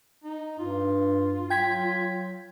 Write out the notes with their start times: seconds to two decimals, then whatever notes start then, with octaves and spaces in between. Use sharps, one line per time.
0.24 D#4
0.59 G2 F4
1.50 F#3 G5 G#6 B6